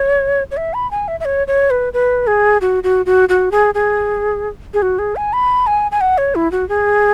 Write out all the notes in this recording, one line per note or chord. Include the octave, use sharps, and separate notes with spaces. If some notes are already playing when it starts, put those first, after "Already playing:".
Already playing: C#5
C#5
E5
B5
G#5
E5
E5
C#5
C#5
B4
B4
G#4
F#4
F#4
F#4
F#4
G#4
G#4
G#4
F#4
G#4
G#5
B5
G#5
G#5
F#5
C#5
E4
F#4
G#4